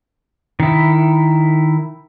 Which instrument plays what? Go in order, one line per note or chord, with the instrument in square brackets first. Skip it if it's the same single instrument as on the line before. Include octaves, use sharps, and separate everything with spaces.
[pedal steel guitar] D#3 E4